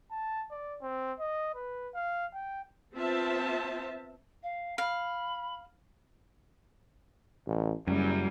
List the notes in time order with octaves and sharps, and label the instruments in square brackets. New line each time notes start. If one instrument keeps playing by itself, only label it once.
[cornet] A5
D5
C4
D#5
B4
F5
G5
[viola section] B3 C4 F4 C5 E5 A5
[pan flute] F5
[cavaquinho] F5 [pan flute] B5
[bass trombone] A1
[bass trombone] F#1 [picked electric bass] F#2 [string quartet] G3